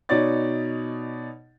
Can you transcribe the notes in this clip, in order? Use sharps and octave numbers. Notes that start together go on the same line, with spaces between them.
B2 D#4 C#5 D5 A6